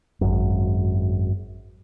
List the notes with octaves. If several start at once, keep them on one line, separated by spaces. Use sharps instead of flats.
G#1 F#2